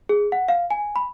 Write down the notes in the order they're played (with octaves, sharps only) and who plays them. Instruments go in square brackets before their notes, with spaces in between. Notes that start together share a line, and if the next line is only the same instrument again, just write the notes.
[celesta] G#4
F#5
F5
G#5
B5